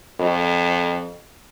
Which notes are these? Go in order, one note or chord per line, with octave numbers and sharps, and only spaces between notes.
F2